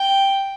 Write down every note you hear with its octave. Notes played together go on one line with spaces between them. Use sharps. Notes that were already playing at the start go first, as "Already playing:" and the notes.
Already playing: G5